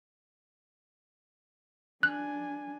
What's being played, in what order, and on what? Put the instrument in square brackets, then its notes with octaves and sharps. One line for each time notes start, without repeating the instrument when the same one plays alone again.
[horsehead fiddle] D4 G#5 [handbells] F#6